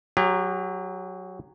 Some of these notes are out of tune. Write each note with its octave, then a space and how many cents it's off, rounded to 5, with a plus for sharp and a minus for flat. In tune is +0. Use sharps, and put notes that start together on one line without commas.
F#3 +0 G4 +40